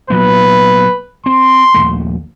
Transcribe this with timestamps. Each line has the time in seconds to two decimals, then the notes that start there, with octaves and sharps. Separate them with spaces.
0.10 A#2 F#3 B3 B4
1.26 C4 C6
1.74 A#1 D#2 A3